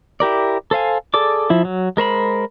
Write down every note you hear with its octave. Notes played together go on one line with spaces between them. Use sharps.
E4 G4 A#4 D5
A4 C5 F5 G#5
G#4 A4 D5 D6
F3 E4
F#3
G#3 A#4 C5 B5